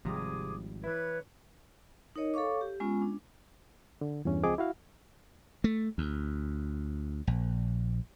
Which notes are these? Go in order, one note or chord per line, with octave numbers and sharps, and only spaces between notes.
G#1 C3 F3 G3 G#4 A#5 D6 D#6
E3 E4 B4 C#5 G#6
D#4 A#4 C#5 D#5
A4 C#5 F5 C#6 D6
G4
G#3 B3 C#4 F4
D4
D3
E2 G2 E3 C#4
C#2 F3 C4 G#4 D#5 D6
E4 F#4 F5
A3
D2
A#1